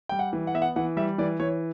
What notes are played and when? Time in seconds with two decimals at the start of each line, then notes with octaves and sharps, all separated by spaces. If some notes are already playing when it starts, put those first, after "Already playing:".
0.09 G3 G5
0.19 F#5
0.33 E3
0.47 F#5
0.54 B3 E5
0.62 F#5
0.76 E3 F#5
0.97 G3 E5
1.18 E3 D5
1.40 E3 C#5